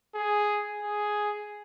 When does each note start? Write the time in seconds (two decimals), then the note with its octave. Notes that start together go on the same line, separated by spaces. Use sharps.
0.15 G#4
0.83 G#4